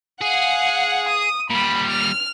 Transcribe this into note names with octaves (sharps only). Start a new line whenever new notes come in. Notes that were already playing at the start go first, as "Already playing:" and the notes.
G#4 F5 F#5
D#6
A#2 G3 B5
F6